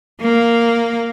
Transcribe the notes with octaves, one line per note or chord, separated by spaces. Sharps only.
A#3